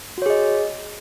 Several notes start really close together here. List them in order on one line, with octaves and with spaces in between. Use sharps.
F#4 C#5 G#4 D#5